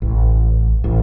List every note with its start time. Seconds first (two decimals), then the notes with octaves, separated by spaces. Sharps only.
0.02 A1
0.84 A1